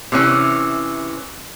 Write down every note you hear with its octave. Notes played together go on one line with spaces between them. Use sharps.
C3 E3 C#4